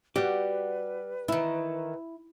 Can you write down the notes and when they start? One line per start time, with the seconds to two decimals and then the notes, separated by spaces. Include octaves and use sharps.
0.16 G3 F#4 G4 B4 F#5
1.28 D#3 E3 E4